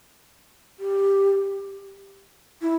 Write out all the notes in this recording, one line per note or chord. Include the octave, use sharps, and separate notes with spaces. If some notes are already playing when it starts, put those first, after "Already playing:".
G4
E4